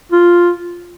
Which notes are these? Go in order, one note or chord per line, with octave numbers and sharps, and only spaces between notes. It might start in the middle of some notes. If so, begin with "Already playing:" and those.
F4